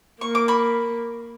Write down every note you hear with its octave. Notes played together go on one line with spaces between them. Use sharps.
A#3 C#6
D6
B5 C#6